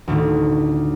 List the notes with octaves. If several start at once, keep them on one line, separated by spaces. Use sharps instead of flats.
D2 A2 D#3